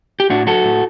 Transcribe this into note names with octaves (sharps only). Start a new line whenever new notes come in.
G4
A2 D4 F#4
F#3 F#4 A4
A2